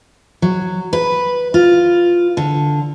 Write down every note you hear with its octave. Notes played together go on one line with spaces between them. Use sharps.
F#3
B4
F4
D3